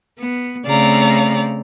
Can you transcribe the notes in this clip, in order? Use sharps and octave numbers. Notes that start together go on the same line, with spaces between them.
B3
C#3 A3 C4 D5 F5 A#5